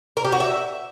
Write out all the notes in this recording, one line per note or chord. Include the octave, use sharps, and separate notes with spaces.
A#4
G4
F#4
E5